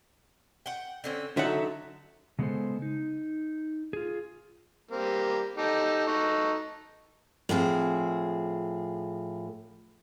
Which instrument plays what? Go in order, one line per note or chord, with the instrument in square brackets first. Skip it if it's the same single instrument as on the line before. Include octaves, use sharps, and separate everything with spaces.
[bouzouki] F#5 G5
D3 C4 C#4
[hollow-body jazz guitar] D3 F#5 [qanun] F#3 D#4 A4 [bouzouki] E5
[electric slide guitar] C#3 G#3 B3 G#4 A4 C5
D#4
F4 G#4
[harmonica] G3 A#3 C4
D#4 G4 A4
D#4 F#4 A4
[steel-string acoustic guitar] A2 F3 C4 G#4